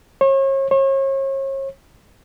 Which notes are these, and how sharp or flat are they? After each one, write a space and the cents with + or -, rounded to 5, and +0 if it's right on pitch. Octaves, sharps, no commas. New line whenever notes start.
C#5 -40
C#5 -40